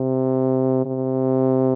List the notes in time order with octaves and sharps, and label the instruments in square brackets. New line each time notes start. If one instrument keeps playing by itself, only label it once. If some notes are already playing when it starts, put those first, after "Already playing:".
Already playing: [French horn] C3
C3